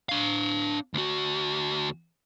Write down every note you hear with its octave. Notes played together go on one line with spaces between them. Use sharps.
D4 F5
D2 F#4